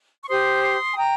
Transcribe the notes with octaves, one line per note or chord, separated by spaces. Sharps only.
C#6
G4 C5 C6 D#6
G#5
G5 A#5